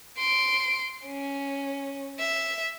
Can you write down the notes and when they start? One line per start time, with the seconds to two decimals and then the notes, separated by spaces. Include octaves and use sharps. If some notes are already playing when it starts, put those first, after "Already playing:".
0.19 C6 D7
1.06 C#4
2.19 E5